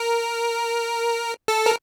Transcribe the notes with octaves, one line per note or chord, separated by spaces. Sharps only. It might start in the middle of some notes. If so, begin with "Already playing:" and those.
Already playing: A#4
A4
A#4